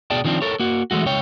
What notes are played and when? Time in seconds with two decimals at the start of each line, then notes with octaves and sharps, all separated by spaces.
0.10 B2 G#4 D5 G5 A5
0.25 D#3 F3 C4 D4
0.42 A4 A#4 C#5
0.60 A#3 F#4
0.91 E3 G#3 A3 F#4
1.06 C#2 C#5 G5